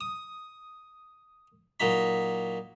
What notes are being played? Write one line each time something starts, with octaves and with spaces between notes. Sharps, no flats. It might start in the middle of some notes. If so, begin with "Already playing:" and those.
D#6
A#2 F#3 D#4 B5